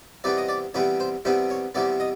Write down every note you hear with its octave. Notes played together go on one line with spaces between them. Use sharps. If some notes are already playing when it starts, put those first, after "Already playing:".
C3 E3 G3 B3 D5
D#5
D5
C3 E3 G3 B3 C#5
C5
C3 E3 G3 B3 C5
C#5
C3 E3 G3 B3 D5
D#5